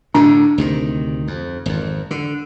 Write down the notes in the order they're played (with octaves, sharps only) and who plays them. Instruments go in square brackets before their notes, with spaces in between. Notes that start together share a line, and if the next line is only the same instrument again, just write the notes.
[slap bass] A2 D3 [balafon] D4
[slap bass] D2 C3 D#3
F2
G#1 F2
D3